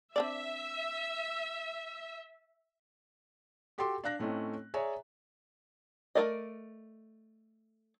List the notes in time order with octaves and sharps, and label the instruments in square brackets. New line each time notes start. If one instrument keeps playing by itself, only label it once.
[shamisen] C4 D4 D5 [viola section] E5
[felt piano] F#4 G4 A4 G5 C6 D6
D4 F5 F#6 A#6
A2 A3 C4 C#4 D#4
G#4 C#5 D5 E5 G#5 A#5
[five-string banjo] A3 E4 A#4 D5 D#5